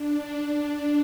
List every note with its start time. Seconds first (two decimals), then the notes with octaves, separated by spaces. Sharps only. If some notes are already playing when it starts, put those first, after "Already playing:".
Already playing: D4
0.57 D4